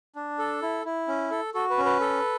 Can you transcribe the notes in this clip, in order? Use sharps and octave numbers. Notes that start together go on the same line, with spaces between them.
D4
A4
E4
E4
C#4
A4
F#4 A4
B4
C#4
B4
A4